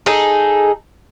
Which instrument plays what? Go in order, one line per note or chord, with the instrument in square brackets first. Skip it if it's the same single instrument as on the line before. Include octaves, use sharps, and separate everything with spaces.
[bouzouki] D#4 G#4 A4